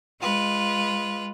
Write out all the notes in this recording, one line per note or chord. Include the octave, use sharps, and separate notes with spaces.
G#3 F4 B4